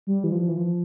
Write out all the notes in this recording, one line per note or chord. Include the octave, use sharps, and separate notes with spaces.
G3
E3
F3
E3
F3